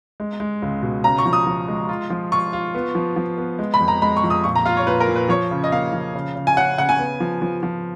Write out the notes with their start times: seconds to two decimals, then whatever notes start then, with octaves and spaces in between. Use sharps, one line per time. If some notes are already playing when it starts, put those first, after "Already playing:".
0.20 G#3
0.40 G#3
0.62 C#2
0.83 B2
1.04 C#3 A#5
1.18 C#6
1.26 F3
1.33 D#6
1.47 F3
1.68 G#3
1.89 F4
2.10 F3
2.32 F4 C#6
2.53 F4
2.75 B3
2.95 F3
3.16 F3
3.38 B3
3.59 G#3
3.74 B5
3.80 F2
3.88 A#5
4.02 G#3 B5
4.17 C#6
4.24 F2
4.30 D#6
4.44 A#2 C#6
4.56 A#5
4.66 F4 F5
4.77 C#5
4.87 A#2 B4
5.00 A#4
5.08 A#2
5.16 B4
5.29 F3 C#5
5.51 C#3
5.64 D#5
5.72 A#3 F5
5.93 F3
6.15 C#3
6.36 C#3
6.47 G#5
6.56 C#4 F#5
6.78 C#3 F#5
6.89 G#5
6.99 B3
7.20 F3
7.42 F3
7.63 F3